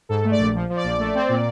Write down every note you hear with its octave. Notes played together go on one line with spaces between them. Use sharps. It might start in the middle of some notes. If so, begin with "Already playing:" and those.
G#2 A4
A3
D5
A#1
F3
F3
D5
A#1
A3
C4
A#2